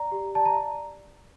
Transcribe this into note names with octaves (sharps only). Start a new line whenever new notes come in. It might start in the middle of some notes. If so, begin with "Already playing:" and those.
Already playing: D5 A#5
G4
D5 A5
A#5